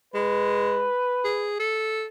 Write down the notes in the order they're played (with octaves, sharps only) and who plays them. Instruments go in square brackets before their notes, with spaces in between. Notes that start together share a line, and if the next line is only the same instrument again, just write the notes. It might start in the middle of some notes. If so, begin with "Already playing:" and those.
[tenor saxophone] G#3 [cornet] B4
[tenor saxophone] G#4
A4